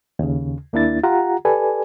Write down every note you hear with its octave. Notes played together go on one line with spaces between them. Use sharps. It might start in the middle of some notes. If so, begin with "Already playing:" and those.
D#2 C#3
D#2 A#3 D4 E4 A6
F4 G4 F#5 A#5
G4 A4 B4 D5 G#5